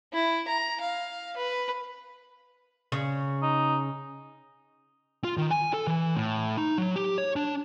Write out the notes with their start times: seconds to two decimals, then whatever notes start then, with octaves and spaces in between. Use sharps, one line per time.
0.13 E4
0.48 A#5
0.81 F5
1.37 B4
2.92 C#3
3.42 D#4
5.24 F4
5.37 D#3
5.51 G#5
5.74 A4
5.87 E3
6.16 A2
6.57 D#4
6.78 F#3
6.96 G4
7.18 C#5
7.36 D4